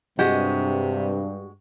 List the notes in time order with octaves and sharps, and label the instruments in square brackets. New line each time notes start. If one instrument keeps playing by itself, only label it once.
[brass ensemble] G2 [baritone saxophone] C3 [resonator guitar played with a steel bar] G#3 F#4 [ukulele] G4